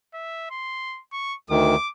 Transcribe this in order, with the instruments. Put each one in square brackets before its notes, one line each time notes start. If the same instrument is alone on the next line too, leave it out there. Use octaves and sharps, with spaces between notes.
[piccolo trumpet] E5
C6
C#6
[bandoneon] D2 D#3 [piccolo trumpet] D6